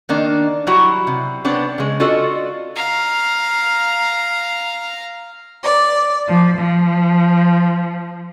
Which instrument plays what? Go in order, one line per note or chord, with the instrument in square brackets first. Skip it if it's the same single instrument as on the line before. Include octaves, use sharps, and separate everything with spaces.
[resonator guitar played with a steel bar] D#3 A#3 D4
F#3 G3 E4 F#4 F#5 A#5
C3
B3 C4 D4 C#5
C#3 G#3
D4 F4 F#4 A4 D5 D#5
[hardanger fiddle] F5 A#5
[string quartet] D5
F3
F3